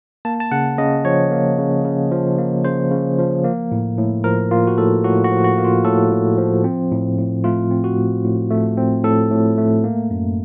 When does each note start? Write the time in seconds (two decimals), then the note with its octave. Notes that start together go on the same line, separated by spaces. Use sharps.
0.25 A#3 A5
0.40 A5
0.52 C#3 F#5
0.78 C#3 D#5
1.05 F3 C#5
1.31 A#3
1.58 C#3
1.85 C#3
2.11 F3
2.38 A#3
2.65 C#3 C5
2.91 C#3
3.18 F3
3.44 A#3
3.72 A2
3.98 A2
4.24 F3 A#4
4.51 A#3 F4
4.67 F#4
4.77 A2 A4
5.04 A2 F#4
5.24 F#4
5.31 F3
5.44 F#4
5.58 A#3
5.64 F4
5.84 A2 A4
6.11 A2
6.38 F3
6.64 C4
6.91 A2
7.18 A2
7.44 A3 F4
7.71 C4
7.84 F#4
7.98 A2
8.24 A2
8.51 A3
8.78 C4
9.04 A2 A4
9.31 A2
9.58 A3
9.84 A#3
10.11 F#2